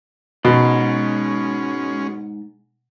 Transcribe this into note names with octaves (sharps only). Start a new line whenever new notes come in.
G#2 B2 G#3 C#4